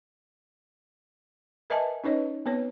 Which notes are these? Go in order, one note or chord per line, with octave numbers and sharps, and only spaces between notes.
A#4 B4 D#5 E5 G#5 A5
C#4 D#4 B4 C#5 D#5
B3 C4 B4 C#5